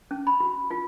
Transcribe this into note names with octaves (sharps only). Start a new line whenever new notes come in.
C#4
B5
F#4
F4